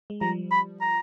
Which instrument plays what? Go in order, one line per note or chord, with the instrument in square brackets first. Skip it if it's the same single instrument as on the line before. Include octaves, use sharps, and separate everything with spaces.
[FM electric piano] G#3
[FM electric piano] F3 G3 [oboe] A#5
[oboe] B5
A#5